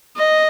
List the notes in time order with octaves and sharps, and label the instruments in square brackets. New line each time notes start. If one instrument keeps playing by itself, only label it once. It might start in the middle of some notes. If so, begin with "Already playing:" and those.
[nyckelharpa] D#5